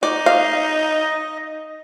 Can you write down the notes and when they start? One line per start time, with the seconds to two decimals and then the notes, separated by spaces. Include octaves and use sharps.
0.03 D#4 D5
0.26 D#5 F5